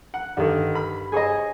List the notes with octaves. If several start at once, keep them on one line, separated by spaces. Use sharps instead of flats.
F#5
G2 D3 D#3
B5
G#4 C5 C#5 D#5 G#5